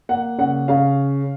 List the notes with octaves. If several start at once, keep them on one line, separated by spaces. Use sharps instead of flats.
A#3 F#5
C#3 F#5
C#3 F5